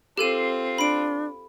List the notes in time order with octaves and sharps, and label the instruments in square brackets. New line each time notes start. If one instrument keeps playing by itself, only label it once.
[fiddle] C4 F4 [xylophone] G4 A4 D#7
[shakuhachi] D4 [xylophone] B5 D7